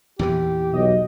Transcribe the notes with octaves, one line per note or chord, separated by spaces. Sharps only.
E2 A#2 E3 G4
B1 D#5